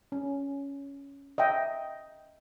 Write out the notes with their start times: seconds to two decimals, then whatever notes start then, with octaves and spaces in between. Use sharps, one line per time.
0.12 C#4
1.38 D#5 E5 G5